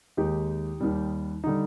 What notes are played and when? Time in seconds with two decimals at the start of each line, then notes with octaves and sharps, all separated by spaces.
0.17 D#2 D#3 G#3 D#4 G4
0.80 D#2 D#3 G3
1.44 D3 G3 D#4